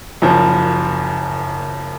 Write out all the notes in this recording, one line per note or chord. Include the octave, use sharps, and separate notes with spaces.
F#1 F#2 F3